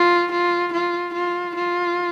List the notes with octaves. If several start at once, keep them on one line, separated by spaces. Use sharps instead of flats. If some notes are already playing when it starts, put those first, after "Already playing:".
Already playing: F4
F4
F4
F4
F4